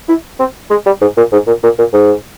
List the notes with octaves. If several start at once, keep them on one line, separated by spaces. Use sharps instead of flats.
E4
C4
G#3
G3
G#2
A#2
G#2
A#2
A#2
A#2
G#2